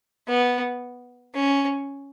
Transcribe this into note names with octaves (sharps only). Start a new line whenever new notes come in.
B3
C#4